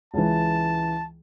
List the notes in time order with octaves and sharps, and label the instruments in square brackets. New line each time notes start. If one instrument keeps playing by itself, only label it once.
[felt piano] C#2 E3 [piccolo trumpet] A5